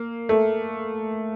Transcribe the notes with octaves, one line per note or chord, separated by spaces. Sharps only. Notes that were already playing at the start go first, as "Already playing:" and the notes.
Already playing: A#3
A3